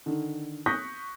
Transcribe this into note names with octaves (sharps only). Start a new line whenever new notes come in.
D3 D#3
C#6 D#6 F#6 G6 A#6 B6